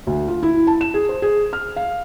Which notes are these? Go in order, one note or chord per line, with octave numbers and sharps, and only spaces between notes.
D2
F4
E4
A5
E7
G#4
C5
G#4
F6
F5